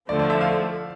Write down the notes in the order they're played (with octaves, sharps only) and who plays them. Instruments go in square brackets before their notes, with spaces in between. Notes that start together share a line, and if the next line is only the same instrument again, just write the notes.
[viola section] D3 F3 A3 [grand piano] D5
[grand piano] D5
E5
F5